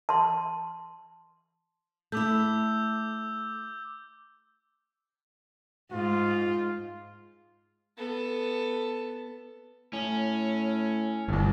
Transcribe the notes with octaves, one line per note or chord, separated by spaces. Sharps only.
A5 C6
A3 E4 D6 E6 G6
G#2 F4
B3 A4
A2 C#4
G1 C2 G2